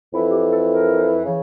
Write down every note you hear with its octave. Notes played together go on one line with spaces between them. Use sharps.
F2 E3 E4
G4
A4
A#4
C#3 E3